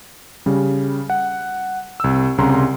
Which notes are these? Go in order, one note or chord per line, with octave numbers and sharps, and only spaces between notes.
C#3 G3
F#5
C2 E6
C2 C#3 A#5 C6